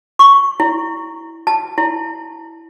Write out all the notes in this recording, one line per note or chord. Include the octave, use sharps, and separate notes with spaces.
C#6
E4
A5
E4